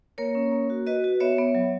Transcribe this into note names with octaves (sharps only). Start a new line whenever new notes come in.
A#3 A#4 C#5
C#4
A#3
F#4
F#4 B4 D#5
F#4
B3 C#5 E5
B3
F#3